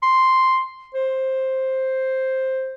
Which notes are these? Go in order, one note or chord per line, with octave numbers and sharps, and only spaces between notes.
C6
C5